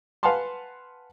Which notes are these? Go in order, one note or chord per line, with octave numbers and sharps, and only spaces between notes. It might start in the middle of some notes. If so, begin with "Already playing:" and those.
B4 F5 F#5 G#5 A5 C6